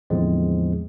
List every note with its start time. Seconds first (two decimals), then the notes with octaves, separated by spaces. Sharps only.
0.10 E2 A2 D3 F3 G#3 C4